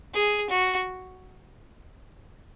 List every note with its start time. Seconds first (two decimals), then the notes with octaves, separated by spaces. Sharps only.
0.14 G#4
0.50 F#4